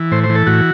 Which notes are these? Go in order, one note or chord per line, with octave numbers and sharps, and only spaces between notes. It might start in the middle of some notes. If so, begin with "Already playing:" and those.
Already playing: E3
A2 C5
C5
E3
A4
A2 F#4